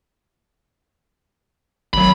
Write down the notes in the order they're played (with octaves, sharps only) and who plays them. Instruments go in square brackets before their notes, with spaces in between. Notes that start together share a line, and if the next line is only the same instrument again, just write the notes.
[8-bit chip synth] G#1 F#3 [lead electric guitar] B5